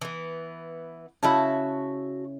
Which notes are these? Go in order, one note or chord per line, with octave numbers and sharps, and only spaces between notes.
E3 B3
C#3 E4 F#4 E5 A5